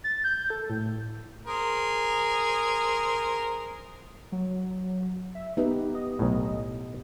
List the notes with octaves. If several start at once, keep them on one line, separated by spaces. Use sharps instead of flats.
A6
G6
A4
A2
G#4 A#4 C5
F#3
E5
B3 D#4 G4 B4
D#5
B1 A2